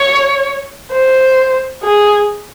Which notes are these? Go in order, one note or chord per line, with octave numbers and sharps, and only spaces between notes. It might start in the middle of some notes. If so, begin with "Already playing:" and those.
Already playing: C#5
C5
G#4